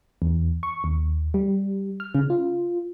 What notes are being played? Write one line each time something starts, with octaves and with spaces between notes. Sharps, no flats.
E2
C#6
D#2
G3
F6
C#3
F4